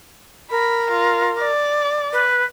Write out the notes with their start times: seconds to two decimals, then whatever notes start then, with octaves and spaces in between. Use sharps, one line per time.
0.51 A#4 B5
0.91 F4
1.39 D5
2.13 B4